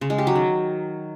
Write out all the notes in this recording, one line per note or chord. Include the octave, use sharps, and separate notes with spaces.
C#3
G#3
G4
F#3
D#3